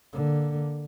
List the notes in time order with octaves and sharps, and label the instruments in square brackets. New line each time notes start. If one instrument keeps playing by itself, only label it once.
[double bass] D3 A#3